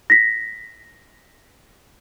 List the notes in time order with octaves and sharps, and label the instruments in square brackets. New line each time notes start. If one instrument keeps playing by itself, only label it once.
[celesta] A#6 B6